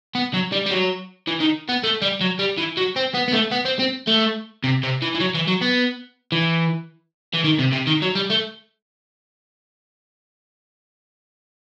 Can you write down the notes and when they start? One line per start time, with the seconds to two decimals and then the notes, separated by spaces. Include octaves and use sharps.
0.15 B3
0.34 F#3
0.52 G3
0.66 G3
0.71 F#3
1.27 E3
1.40 D#3
1.69 B3
1.83 A3
2.02 G3
2.21 F#3
2.39 G3
2.57 E3
2.77 F#3
2.96 C4
3.14 B3
3.28 B3
3.33 A3
3.52 B3
3.65 C4
3.79 C4
4.07 A3
4.64 C3
4.83 C3
5.02 E3
5.15 E3
5.20 F#3
5.35 E3
5.48 F#3
5.62 B3
6.32 E3
7.34 E3
7.45 D#3
7.59 C3
7.73 C3
7.87 D#3
8.02 F#3
8.15 G3
8.30 A3